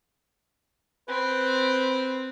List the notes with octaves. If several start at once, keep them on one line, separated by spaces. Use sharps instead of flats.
C4 B4